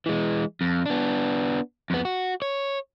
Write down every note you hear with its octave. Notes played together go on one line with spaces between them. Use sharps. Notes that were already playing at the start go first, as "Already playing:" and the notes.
E3 G#3
F2
B3 D4
F2 B3
F#4
C#5